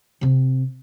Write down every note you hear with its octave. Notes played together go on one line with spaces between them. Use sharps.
C3 C4